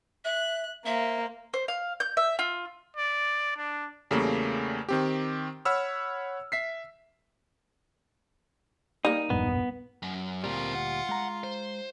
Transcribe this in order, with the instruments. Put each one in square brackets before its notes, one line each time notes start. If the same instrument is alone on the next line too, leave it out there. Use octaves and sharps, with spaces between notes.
[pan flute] E5 [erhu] F#6
[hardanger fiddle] A#3 [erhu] C5 [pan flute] E5
[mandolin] C5
F5
G6
E5
F4
[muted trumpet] D5
D4
[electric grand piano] E2 C#3 G3 A3 A#3
D#3 C4 G4
C#5 F#5 B5 E6 F6
E5 B6 C7
[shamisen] G3 A#3 [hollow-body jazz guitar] D#4
[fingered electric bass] E1 A#1 G2 [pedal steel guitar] B3
[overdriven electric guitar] F#2
[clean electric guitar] D2 A#2 G3 [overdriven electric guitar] C4 A#4 [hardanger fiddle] F4
[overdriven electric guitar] F#5
[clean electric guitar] G#3 A#5
[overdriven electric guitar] C5